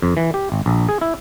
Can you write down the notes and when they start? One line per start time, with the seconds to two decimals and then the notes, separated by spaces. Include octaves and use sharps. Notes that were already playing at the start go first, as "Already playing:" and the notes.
0.02 F2
0.17 E3
0.34 G4
0.52 G#1
0.66 A#1
0.89 G#4
1.01 E4